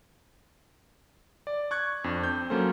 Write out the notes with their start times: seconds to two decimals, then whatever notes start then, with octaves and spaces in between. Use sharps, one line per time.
1.47 D5
1.71 C#6 F#6 G#6
2.04 F2 D4
2.24 C4 G6
2.50 F#3 A#3 C#4 A4 C5